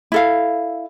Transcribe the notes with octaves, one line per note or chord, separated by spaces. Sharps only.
E4 A4 F5